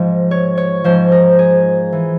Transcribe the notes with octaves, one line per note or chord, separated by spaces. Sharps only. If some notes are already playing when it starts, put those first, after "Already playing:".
Already playing: G#2 F3
C#5
C#5
G#2 F3 C5
A#4
G#4
E3